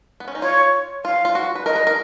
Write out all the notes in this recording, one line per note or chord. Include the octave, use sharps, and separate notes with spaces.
B3
C#4
D#4
F4 C#5
F4 F5
F4
F#4
B4
A#4 D#5
B4
A#4